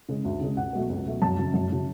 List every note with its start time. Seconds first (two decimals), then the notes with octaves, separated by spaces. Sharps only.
0.09 C#3 G#3
0.25 D2
0.41 C#3 G#3
0.57 C#2 F#5
0.73 B2 F#3 A3
0.89 C#2
1.06 B2 F#3 A3
1.22 F#2 A5
1.38 C#3 F#3
1.54 F#2
1.70 C#3 F#3